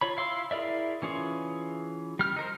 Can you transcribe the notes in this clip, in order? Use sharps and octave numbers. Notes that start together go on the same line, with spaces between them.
F4 C#5 B5
E4 F5 C6 E6
E4 G#4 A#4 D5 E5
E3 C#4 F4 G#4
G3 F6
D#4 A#4 C5